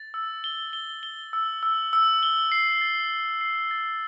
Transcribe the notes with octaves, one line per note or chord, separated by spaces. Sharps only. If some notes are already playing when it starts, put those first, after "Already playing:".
Already playing: A6
E6
G7
G7
G7
E6
E6
E6
G7
C7
A6
C7
C7
A6